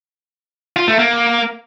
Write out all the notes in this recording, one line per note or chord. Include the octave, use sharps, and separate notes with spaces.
F4
A3
A#3